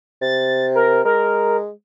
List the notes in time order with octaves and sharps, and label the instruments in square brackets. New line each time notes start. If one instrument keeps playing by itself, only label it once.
[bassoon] C3 [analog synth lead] A6
[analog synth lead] A#4
[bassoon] G#3 [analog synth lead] A#4